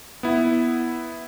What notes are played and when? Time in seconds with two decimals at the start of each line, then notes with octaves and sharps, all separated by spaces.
0.23 B3 E4